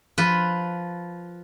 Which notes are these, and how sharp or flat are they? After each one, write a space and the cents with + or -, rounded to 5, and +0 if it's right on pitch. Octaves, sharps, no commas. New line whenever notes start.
F3 +0 B4 +0